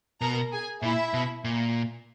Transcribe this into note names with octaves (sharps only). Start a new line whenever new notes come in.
B2 A#4 A#5
G#4 G#5
A#2 E4 E5
B2
A#2